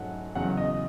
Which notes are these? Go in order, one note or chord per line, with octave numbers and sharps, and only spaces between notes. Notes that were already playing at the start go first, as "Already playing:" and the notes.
Already playing: G#2 F#3 A3 C#4 F#5
E2 C#3 F#3 F#5
D#5